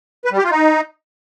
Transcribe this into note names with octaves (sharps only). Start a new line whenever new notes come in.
B4
G3
G4
F4
D#4